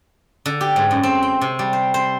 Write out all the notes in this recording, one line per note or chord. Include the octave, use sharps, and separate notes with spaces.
D3
G4
G#2
F#2
C4
G5
C3
G3
C5
C5